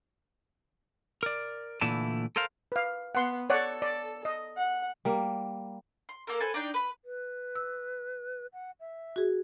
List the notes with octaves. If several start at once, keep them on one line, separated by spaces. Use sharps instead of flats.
A#4 D5
A#2 D3 E3 A3 E4 A5
A4 A#4 C5 F5
B4 F5
B3 F#5 C6
A4 C#5 D5 F#5
D5
D#5
F#5
G3 A#3
C6
A#3 A4 A#4
A4 B4 C5 G#5
D4 D#4 D5 G5
B4 B5
B4
E6
F#5
E5
F#4 G#4